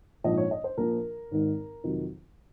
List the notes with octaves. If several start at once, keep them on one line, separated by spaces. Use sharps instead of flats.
A#1 G#2 F3 D#5
C#5
D#5
C5
A#1 A#2 F3 A#4
G#1 G#2 D#3
F2 C3 D#3 F#3